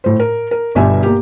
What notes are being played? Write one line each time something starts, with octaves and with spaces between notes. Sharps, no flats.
A2 C5
A#4
A#4
G1 G2 B2 G4 E5 G#5
A#3 G4